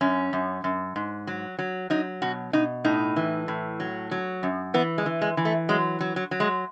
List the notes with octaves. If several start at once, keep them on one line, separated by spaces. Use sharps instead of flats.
F#2 C#4
F#2
F#2
G#2
F#3
F#3
F#3 D#4
B2 F#4
B2 D#4
A2 D#4
E3
A2
F#3
F#3
F#2
E3 B3
G#3
E3
G#3
E3
A3
F#3 G#3
F#3
F#3
F#3
G#3